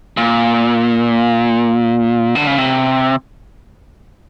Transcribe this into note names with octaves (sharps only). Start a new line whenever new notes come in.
A#2
D3
C#3
C3